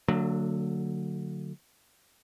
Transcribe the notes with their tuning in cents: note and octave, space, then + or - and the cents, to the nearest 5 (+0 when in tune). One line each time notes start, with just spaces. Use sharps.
D3 +0 F#3 -10 A3 +45